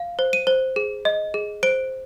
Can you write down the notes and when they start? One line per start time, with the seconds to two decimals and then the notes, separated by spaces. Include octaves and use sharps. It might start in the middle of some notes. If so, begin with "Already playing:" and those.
Already playing: F5
0.19 C5
0.33 D#7
0.47 C5
0.76 G#4
1.05 D#5
1.34 G#4
1.63 C5 D7